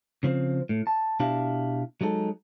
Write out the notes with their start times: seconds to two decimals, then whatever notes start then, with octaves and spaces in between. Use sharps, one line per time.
0.23 C#3 F3 C4
0.69 A2
0.87 A5
1.20 B2 D4 E4 G4 F5 A5
2.01 F#3 G#3 D#4 A4